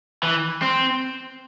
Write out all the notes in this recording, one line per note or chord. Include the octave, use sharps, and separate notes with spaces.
E3
C4